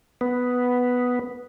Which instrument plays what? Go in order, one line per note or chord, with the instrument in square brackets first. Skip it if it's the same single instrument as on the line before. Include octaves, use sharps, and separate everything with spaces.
[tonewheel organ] B3